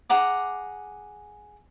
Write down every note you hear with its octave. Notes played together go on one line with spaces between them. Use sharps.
G#4 F#5 A#5 D6